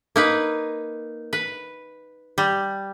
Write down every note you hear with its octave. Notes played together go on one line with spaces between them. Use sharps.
A#3 D#4 B4
B4
G3